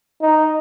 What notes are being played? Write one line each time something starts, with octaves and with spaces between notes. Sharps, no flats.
D#4